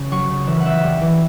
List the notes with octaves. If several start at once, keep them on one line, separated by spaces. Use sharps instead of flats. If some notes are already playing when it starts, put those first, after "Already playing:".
Already playing: C#3 C#4
F#3 C#6
C#3
E3 E5
F#5
E3 E5
G3
E3